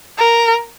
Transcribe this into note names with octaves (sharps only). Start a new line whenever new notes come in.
A#4